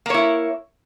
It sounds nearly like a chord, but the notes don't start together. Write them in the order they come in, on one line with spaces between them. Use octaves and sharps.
A#3 C#5 E4